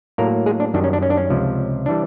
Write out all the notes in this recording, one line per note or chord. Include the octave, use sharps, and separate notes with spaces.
A2 F#3 A#3 A#4
G#3 G#4
D4
F#2 D#3 G3 D4
C#4
D4
C#4
D4
C#4
C#2 C3 F3
E3 G3 D4